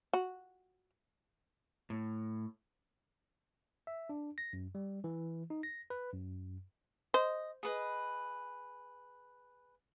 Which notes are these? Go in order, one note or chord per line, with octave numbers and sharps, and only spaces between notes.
F#4
A2
E5
D4
A#6
F#2
G3
E3
D#4
A#6
B4
F#2
C5 D#5
G#4 B4 D#5